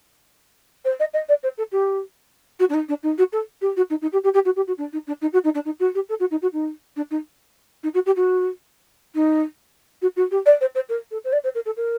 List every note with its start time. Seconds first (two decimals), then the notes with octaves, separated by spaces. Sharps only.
0.85 C5
1.00 D#5
1.14 D#5
1.29 D5
1.43 C5
1.58 A4
1.72 G4
2.60 F#4
2.70 D4
2.74 D#4
2.89 D4
3.03 D#4
3.18 F#4
3.33 A4
3.61 G4
3.77 F#4
3.90 D#4
4.02 D#4
4.13 G4
4.24 G4
4.34 G4
4.45 F#4
4.56 G4
4.68 F#4
4.78 D4
4.93 D#4
5.07 D4
5.22 D#4
5.33 F#4
5.44 D#4
5.55 D4
5.65 D#4
5.80 F#4
5.95 G4
6.09 A4
6.20 F#4
6.31 D#4
6.42 F#4
6.53 D#4
6.96 D4
7.11 D#4
7.83 D#4
7.94 F#4
8.06 G4
8.16 F#4
9.15 D#4
10.02 F#4
10.16 F#4
10.31 G4
10.46 D5
10.61 C5
10.75 C5
10.89 A#4
11.11 A4
11.25 C5
11.33 D5
11.44 C5
11.55 A#4
11.66 A4
11.77 A#4